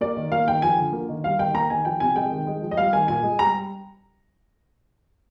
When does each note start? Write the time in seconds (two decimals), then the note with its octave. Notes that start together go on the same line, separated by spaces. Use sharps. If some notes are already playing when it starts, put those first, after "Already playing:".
0.01 A#3 D5
0.16 D#3
0.32 A#3 F5
0.47 D#3 G5
0.62 F3 G#5
0.78 D3
0.93 A#3
1.09 D#3
1.24 G3 F5
1.39 D#3 G5
1.54 A#3 A#5
1.70 D#3 G#5
1.85 F3 G5
2.00 C3 G#5
2.16 G#3 G5
2.31 D#3
2.47 G#3
2.62 F3
2.71 D#5
2.77 G3 F5
2.93 D#3 G#5
3.08 A#2 G#5
3.23 G#3
3.39 G3 A#5